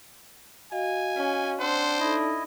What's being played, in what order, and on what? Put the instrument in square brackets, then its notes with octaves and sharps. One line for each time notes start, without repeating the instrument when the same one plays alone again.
[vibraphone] F#4 D#5 F5 [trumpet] G#5
[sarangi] C#4
[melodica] C4 F#5 C6 [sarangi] D4 [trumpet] C5
[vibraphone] D#4 A4 [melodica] E4 D#5